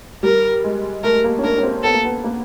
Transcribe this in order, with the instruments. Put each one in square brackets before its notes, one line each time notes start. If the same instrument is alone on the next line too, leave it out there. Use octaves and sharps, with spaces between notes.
[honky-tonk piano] G3 [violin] A#4
[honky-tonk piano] G#3
[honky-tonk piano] A3 [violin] A#4
[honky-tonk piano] A#3
C#4
[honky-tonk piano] D4 [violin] A#4
[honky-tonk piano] C#4
C4
[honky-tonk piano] B3 [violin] A4
[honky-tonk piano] A#3
B3
A#3